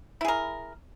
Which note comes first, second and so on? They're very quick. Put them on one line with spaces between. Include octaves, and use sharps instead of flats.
E4 G#4 A#4